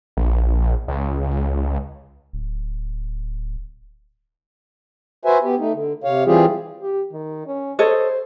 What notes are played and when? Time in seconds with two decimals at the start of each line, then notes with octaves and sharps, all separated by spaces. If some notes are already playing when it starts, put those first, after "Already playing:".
0.17 A#1
0.88 C#2
2.33 D1
5.25 F#4 B4 C5 E5 G#5
5.43 B3 G4
5.59 A3 D#4
5.73 D3
6.04 C3 C#5 F5
6.26 E3 G3 C4 F4 G4 G#4
6.82 G4
7.13 D#3
7.47 C#4
7.79 A4 C5 C#5 D#5